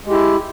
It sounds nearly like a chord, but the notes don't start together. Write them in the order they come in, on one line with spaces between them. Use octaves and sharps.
G#3 G4 E4